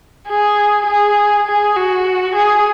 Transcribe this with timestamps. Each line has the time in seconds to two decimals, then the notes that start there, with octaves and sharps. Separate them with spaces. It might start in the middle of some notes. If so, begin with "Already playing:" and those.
0.28 G#4
0.86 G#4
1.47 G#4
1.76 F#4
2.35 G#4